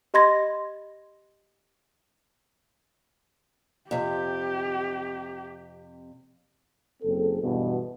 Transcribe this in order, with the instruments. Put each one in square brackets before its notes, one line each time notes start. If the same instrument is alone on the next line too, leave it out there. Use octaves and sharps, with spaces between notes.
[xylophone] G4 D#5 B5 C6 G#6 A#6
[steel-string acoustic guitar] F2 C3 [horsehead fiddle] G4
[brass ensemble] F#1 C4 G#4 A4
E2 G2 B2